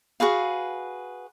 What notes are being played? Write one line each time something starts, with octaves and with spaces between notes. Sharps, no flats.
F#4 G#4 B4 F5